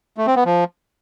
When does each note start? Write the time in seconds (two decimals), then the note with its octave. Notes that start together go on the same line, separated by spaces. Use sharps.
0.17 A3
0.27 C4
0.36 B3
0.45 F3